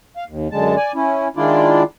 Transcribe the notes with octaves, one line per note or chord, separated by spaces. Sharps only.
F5
D#2
F#2 D3 G#3 A5
D5 G#5
C#4 E4
D#3 G#3 D4 E4 F4 D5